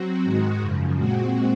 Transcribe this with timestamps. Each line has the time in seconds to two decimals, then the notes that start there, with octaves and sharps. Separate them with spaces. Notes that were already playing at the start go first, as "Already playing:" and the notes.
Already playing: F#3 C4 F#4
0.24 G#2 D#3 G#3
0.60 F#2 C#3 F3
0.96 A#2 G#3 C4 F#4